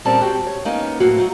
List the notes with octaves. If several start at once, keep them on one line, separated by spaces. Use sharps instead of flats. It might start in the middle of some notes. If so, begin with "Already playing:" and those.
A#2 G3 C4 C#4 D5 A5
C4 F#4 G4
C#5
A#3 B3 C#4 D#4
A2 F3 F#3 A#3 F#4
F#3 D#4